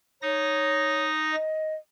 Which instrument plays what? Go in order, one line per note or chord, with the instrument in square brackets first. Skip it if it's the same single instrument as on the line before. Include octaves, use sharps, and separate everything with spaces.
[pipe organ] D#4 D#6 A#6 [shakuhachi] C#5
[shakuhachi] D#5